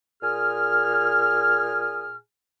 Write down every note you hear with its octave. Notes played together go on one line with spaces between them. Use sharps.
A#2 G#4 G#5 F6